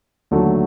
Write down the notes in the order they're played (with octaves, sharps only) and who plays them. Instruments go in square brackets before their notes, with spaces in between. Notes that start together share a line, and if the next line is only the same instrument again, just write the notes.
[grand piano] D#2 D3 F#3 A3